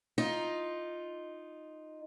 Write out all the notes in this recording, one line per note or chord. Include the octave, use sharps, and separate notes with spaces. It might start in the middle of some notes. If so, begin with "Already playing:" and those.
D#4 F4